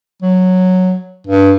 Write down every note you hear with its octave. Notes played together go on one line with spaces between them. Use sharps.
F#3
G2